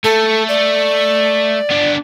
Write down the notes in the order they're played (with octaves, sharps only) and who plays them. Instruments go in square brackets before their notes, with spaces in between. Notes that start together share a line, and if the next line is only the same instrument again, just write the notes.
[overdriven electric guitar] A3 [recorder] A4
[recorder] D5
[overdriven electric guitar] B3 D4